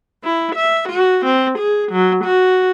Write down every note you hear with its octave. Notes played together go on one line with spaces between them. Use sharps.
E4
E5
F#4
C4
G#4
F#3
F#4